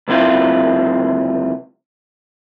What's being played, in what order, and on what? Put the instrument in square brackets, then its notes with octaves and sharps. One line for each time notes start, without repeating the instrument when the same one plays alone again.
[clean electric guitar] C#2 F#2 C3 E4 F4